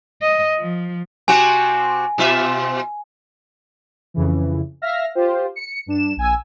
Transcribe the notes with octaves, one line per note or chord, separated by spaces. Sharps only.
D#5
F3
C3 C4 F#4 G#5
B2 F4 E5
F2 C#3 E3
E5 F5 F6 A#6
F4 G4 C5
C#7
G2 D4 E7
A#1 G#5 E6